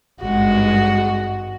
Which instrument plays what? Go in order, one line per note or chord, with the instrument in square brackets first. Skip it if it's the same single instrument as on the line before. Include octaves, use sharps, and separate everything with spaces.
[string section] G#1 G2 G#3 [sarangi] F#4